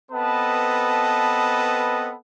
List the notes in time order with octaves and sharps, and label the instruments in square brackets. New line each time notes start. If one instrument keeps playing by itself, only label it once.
[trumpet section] B3 C4 A4 B4 D#5 A5